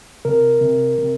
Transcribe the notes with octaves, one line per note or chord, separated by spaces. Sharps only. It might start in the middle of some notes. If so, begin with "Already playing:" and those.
C3 A#4
C3
C3